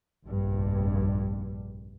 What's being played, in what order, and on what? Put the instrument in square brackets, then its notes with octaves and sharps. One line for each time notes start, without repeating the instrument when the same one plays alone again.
[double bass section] F1 A#1 G2